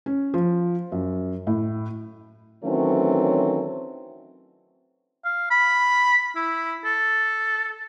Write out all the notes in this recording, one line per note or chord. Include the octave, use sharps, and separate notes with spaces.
C#4
F3
F#2
A2
D#3 E3 F#3 A3 C4 C#4
F5
B5
E4
A4